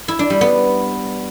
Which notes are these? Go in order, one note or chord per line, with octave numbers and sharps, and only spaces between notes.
E4
D4
G3
B3